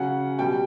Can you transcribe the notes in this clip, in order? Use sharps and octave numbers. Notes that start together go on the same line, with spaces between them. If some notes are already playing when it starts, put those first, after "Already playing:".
Already playing: C#3 F#3 F#5
B2 G3 G5